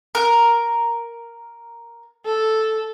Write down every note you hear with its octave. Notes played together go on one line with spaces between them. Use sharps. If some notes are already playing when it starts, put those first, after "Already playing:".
A#4
A4